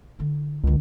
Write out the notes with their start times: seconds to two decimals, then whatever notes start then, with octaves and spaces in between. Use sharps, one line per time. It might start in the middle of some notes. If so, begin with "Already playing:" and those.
0.19 D3 E4
0.64 C#2 F#2 D3